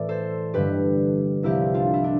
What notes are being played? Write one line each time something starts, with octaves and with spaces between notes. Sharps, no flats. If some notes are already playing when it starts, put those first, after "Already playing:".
Already playing: A2 E3 A3 D5
A4 C5
G2 D3 G3 G4 B4
C2 C3 F3 E4 G4
D4 F4
E4
D4